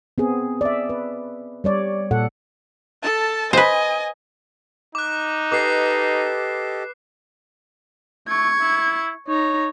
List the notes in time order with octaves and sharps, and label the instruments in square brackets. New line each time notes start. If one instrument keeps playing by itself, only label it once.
[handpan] B3 C4 G#4
D5 E5
B4
G3 C#5 D5
A#2 A4 F#5
[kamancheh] A4 A5
[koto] B4 C5 [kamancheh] D#5 G#5
[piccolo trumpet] D#4 [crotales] D6 F#6
[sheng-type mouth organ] G4 A4 D#5 [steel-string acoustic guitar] B4 [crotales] D6 C7
[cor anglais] A3 [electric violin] C#6 G#6
[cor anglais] E4
[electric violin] D#4 A#5 [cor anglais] C#5